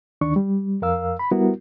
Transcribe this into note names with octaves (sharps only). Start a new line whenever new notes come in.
D2 D#3 D4 C#6
G3
F2 A#4 F5 E6
B5
G3 B3 E4 F#4 A#4